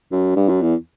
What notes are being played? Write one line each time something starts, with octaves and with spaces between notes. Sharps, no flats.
F#2
G2
F#2
E2